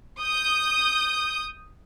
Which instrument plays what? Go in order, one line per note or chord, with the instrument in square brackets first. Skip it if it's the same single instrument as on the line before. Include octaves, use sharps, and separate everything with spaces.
[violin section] D#6 G6